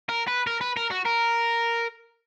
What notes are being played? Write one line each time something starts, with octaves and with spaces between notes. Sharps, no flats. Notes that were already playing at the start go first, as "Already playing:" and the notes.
A#4
B4
A#4
B4
A#4
F#4
A#4